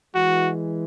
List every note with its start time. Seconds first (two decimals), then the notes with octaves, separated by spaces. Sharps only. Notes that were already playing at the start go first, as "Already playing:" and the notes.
0.15 E3 G#3 F#4